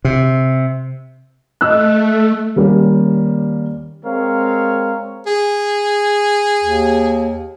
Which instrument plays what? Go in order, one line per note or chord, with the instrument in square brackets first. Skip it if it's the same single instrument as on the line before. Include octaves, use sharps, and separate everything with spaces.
[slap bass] C3
[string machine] A3 [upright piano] D#5 E6 F#6
[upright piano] D#2 G3 A#3 C#4
[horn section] G#3 C4 A#4 C#5 F5
[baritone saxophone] G#4
[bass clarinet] D#2